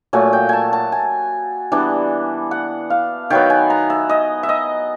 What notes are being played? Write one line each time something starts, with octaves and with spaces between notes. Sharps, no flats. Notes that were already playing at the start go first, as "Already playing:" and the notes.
A#2 F#3 A3 G#5
G5
G#5 A5
A5
G#5
E3 G3 B3 D4
F#5
F5
D#3 F#3 B3 G5
G#5
A#5
E5
D#5
E5
D#5